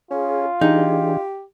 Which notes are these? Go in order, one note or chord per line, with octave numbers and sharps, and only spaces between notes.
C#4 F4 G#4
E3 D4 D#4 G4 G#4